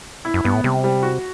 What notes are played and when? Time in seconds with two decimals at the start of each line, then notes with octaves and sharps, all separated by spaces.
0.25 E4
0.34 F#2
0.44 G2 B3
0.54 A2
0.64 C3 G3
0.84 G3
1.03 F#4